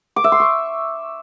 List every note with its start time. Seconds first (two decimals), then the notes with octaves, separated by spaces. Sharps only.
0.16 D6
0.24 E5
0.32 C6
0.40 C#6